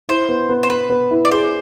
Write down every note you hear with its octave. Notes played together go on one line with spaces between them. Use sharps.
E4 C5
B3
B3
C5
B3 B4
B3
E4
D5
G#4 C5